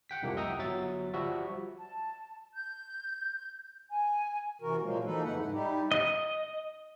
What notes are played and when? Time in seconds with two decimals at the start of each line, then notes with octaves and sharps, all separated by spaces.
0.09 F#5 G5 B6
0.22 C2 F2 C3 F3 A#3
0.37 D#5 E5 F#5 G5 A#5 D#6
0.58 G1 F#3 E5 A6
1.14 F3 G3 F#4 E5
1.77 A5
2.54 G6
3.90 G#5
4.62 C3 E3 F#4 A#4
4.82 A#2 F3 F#3 G#3 A#3
5.04 E3 F3 A#3 D#4 A4 B4
5.24 F2 C#3 A3 D#4 B4 F#5
5.36 G#2 E4
5.52 G3 D#4 E4 G4
5.92 D#5